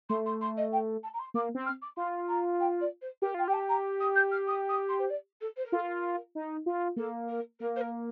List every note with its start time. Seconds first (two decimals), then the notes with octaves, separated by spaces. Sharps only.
0.09 A3 C6
0.25 C6
0.41 C6
0.57 D#5
0.72 G5
1.03 A5
1.13 A#5
1.19 C6
1.34 A#3 D6
1.55 C4
1.66 F6
1.81 D6
1.97 F4 C6
2.28 A#5
2.60 G5
2.80 D5
3.01 C5
3.22 G4 A#4
3.34 F4 G5
3.48 G4 G5
3.53 A5
3.68 A#5
4.00 D#6
4.15 G6
4.31 F6
4.47 D#6
4.68 D#6
4.88 C6
4.99 C5
5.10 D5
5.40 A4
5.56 C5
5.65 A#4
5.72 F4 A4
5.82 A#4
6.35 D#4
6.66 F4
6.96 A#3 A4
7.28 A#4
7.59 A#3 A#4
7.76 C5
7.80 A#4